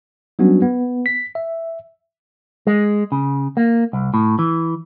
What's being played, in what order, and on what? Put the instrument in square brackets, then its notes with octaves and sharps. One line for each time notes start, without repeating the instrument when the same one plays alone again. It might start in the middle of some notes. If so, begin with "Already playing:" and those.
[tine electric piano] F#3 G3 B3 C#4 D4 F#4
B3
B6
E5
[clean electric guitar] G#3
C#3
A#3
C2
A2
E3